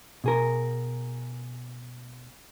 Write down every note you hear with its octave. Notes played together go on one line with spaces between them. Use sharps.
B2 G#4 A#4